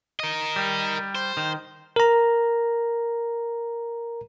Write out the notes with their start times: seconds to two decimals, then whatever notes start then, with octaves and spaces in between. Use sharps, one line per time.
0.20 A#4 D#5
0.56 G3
1.15 C5
1.37 D#3
1.96 A#4 A#5